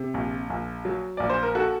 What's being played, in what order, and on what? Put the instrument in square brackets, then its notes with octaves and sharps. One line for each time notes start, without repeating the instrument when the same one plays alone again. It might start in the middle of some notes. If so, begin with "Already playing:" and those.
Already playing: [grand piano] C3
A#1
A#1
F#3
A#1 D5
C5
A#4
F#4 A4